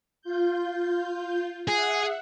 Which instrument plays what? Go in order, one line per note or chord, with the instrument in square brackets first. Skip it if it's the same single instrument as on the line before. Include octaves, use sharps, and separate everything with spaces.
[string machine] F4 G6
[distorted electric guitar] G#4 [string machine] E5 F#5